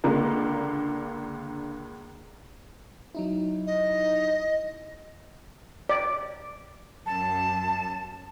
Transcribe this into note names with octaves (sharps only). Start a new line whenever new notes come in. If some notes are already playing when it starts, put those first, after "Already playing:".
C#2 D3 A#3
F#3 D#4 E4
D#5
D5
F#2 A5